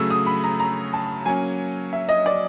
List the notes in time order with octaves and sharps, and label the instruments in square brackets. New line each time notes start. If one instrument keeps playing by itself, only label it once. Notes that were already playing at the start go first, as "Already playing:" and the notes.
Already playing: [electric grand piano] C#3 F#3 A3 [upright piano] E6
[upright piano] D#6
B5
A#5
A#5
A5
[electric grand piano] F#3 A#3 C#4 [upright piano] G#5
[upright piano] E5
D#5
D5